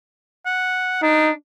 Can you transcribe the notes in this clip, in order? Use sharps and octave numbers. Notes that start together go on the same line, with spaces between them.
F#5
D4 D#4